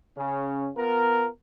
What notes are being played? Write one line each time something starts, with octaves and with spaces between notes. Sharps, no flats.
C#3 C#4
B3 F4 A#4